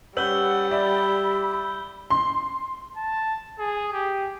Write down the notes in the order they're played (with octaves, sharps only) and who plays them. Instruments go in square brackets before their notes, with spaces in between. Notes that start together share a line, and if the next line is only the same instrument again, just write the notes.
[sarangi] G3 [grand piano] C#4 B4 F#7 [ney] F#5 [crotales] E6 G6 G7
[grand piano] D5 E5 [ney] B5
[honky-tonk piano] C6
[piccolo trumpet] A5
G#4
G4